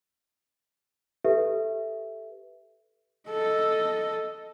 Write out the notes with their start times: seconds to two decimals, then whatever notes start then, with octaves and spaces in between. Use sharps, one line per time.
1.25 G4 A4 B4 E5
3.29 A4 D#5